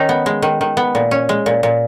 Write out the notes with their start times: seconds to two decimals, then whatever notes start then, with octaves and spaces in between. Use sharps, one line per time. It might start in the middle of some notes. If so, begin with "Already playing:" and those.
Already playing: D#3 C#4 D#4
0.09 B3
0.26 G#3
0.42 D#3
0.61 D#3
0.77 B3
0.95 A#2
1.11 C#4
1.29 G#3
1.46 A#2
1.63 A#2